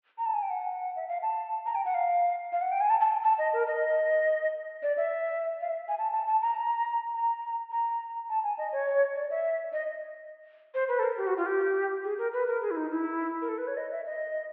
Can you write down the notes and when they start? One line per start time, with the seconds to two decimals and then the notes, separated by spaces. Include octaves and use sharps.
0.18 A#5
0.26 A5
0.34 G#5
0.42 G5
0.50 F#5
0.96 E5
1.08 F5
1.22 A5
1.66 A#5
1.75 G5
1.85 F#5
1.94 F5
2.53 F5
2.62 F#5
2.71 G5
2.81 G#5
2.90 A5
3.00 A5
3.24 A5
3.38 D#5
3.53 A#4
3.67 D#5
4.83 D5
4.97 E5
5.61 F5
5.70 E5
5.88 G#5
5.99 A5
6.12 A5
6.27 A5
6.42 A#5
7.14 A#5
7.71 A#5
8.29 A5
8.44 G#5
8.58 D#5
8.72 C#5
9.15 D5
9.30 E5
9.72 D#5
10.74 C5
10.89 B4
10.99 A4
11.03 A#4
11.17 G4
11.27 F#4
11.37 F4
11.46 G4
12.04 G#4
12.18 A#4
12.33 B4
12.48 A#4
12.62 G#4
12.71 E4
12.76 D#4
12.91 E4
13.42 A#4
13.48 A4
13.58 B4
13.67 C#5
13.77 D#5
13.91 E5
14.06 D#5